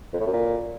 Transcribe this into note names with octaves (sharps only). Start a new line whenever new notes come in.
F2
A2
F#2
A#2